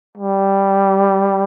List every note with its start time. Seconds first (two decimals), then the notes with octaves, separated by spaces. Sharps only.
0.17 G3